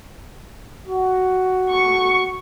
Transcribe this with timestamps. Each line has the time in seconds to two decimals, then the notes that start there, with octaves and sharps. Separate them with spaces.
0.87 F#4
1.70 C#6